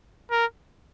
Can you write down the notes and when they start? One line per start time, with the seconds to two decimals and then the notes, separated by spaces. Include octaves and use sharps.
0.31 A#4